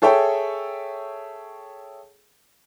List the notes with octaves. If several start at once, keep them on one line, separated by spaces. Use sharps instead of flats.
G#4 A4 C#5 E5 G5